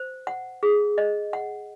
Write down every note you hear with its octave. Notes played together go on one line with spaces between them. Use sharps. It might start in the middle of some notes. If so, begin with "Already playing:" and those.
Already playing: C5
F#5
G#4
D#5
F#5